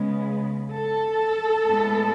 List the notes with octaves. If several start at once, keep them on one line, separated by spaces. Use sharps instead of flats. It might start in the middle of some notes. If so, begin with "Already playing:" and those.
Already playing: C#3 G#3 B3
A4
A2 G#3 B3